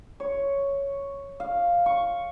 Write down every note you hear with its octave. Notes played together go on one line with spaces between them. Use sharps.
C#5
F5
C#6